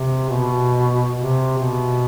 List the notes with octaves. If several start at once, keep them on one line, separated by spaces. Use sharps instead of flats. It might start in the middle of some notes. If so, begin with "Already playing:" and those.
Already playing: C3
B2
C3
B2